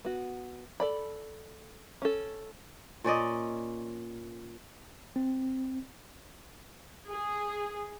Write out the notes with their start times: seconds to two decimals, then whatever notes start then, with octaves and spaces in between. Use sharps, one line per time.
0.05 B3 F#4
0.80 A4 D5 B5
2.02 C#4 A4
3.04 A#2 C#4 D5 D#5
5.16 C4
7.10 G#4